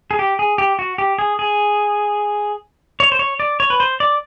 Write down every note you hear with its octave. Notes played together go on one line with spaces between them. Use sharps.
G#4
G4
G#4
G4
F#4
G4
G#4
G#4
C#5
C5
C#5
D5
C#5
B4
C5
D5